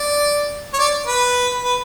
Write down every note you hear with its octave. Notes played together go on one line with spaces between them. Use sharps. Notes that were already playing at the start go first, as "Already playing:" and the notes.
Already playing: D5
C#5
D5
B4
B4